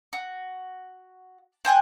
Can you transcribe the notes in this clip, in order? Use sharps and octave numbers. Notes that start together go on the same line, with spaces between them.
F#4
C5 G5 G#5 F#6